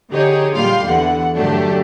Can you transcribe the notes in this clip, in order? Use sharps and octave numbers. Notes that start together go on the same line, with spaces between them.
D3 D#4 G4 G#4 C#5
A#2 G3 F4 G4 F5 C6
E2 D3 E3 F#5
G2 D3 F#3 A3 D4 G4